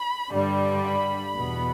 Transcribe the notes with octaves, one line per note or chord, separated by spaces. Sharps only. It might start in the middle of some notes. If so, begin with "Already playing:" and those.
Already playing: B5
G2 D3 G3
B5
E2 B2 B3